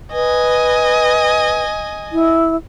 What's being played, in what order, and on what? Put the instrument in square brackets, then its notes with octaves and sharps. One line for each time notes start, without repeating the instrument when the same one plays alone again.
[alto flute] B4 [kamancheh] D#5 G#5
[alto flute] E4